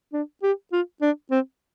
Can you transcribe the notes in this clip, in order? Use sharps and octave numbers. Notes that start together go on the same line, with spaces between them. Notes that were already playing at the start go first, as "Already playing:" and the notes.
D4
G4
F4
D4
C4